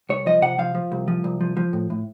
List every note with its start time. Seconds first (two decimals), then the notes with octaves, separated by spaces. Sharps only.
0.09 C2 C#5
0.26 F3 D#5
0.42 C3 F#5
0.58 F3 F5
0.75 F3
0.92 C2
1.08 F3
1.24 C2
1.41 F3
1.57 F3
1.73 A2
1.90 A2